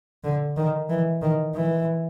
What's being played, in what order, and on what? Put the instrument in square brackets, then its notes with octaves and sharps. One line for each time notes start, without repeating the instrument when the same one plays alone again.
[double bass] D3
D#3
E3
D#3
E3